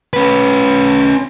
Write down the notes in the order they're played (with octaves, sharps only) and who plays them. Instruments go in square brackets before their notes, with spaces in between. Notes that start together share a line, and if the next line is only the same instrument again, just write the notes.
[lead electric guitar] C#4 B4